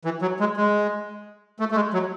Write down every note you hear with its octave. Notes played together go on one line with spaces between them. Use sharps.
E3
F#3
G#3
G#3
A3
A3
G#3
F#3